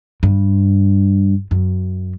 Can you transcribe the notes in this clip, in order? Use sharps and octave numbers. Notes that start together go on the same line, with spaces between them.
G2
F#2